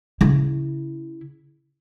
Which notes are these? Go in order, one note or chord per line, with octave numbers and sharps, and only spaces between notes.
C#3 E4